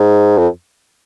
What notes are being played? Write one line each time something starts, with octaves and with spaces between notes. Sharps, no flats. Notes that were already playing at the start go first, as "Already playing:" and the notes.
Already playing: G#2
F2